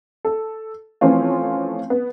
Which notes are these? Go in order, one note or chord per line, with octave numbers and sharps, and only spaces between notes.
A4
E3 F3 A3 C4 C#4 F4
B3